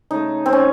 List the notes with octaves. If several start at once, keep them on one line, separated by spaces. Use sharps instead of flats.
C#3 A3 D#4
C4
C#4